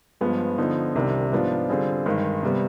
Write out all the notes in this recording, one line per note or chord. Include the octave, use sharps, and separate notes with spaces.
G2 F3 G#3 B3
D3 F3 B3 D#4
C2 C3 D#3 G3 D4
G#2 F3 B3 D4 F4
D3 G3 C4 F4 G#4
G2 D#3 G#3
C3 G3 B3